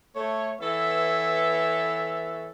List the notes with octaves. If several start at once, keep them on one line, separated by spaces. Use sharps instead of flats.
A3 C#5
E3 B3 A4 C#5 E5